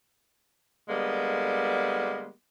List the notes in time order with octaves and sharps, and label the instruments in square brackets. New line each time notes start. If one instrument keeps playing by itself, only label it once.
[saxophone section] D3 G3 G#3 A#3 B3